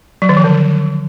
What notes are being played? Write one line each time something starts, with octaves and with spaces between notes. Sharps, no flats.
F#3
D#3
F3
D3